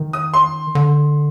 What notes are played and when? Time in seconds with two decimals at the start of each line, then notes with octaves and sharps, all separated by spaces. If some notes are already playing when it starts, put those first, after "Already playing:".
Already playing: D#3
0.13 D#6
0.34 C6
0.75 D3